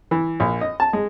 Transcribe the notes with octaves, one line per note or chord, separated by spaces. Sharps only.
E3
A#1
D#5
A5
G#3